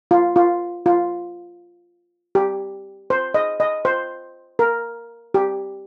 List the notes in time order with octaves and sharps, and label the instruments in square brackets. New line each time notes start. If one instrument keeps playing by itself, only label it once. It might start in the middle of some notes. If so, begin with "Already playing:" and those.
[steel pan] F4
F4
F4
G4
C5
D#5
D#5
C5
A#4
G4